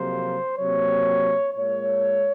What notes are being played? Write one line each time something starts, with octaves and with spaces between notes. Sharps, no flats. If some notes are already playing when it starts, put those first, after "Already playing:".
Already playing: F2 C3 F#3 A#3 C5
C3 F#3 A#3 C#5
A#2 G#3 C#5